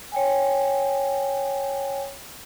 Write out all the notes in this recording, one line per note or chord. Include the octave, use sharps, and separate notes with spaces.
C#5 G5 G#5